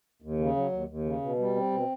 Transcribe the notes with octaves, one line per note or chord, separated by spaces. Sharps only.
D#2
C#3
F#3
D#2
D#2
C#3
B2
G3
C4
B2